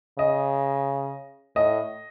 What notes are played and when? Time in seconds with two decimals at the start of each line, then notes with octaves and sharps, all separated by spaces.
0.18 C#3 D#5
1.56 A2 D#5